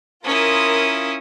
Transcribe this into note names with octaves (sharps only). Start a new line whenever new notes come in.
C#4 E4 F4 A#4 D#6